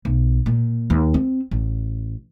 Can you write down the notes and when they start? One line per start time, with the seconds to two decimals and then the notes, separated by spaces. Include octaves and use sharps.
0.05 B1
0.46 A#2
0.90 D#2
1.14 C4
1.51 A1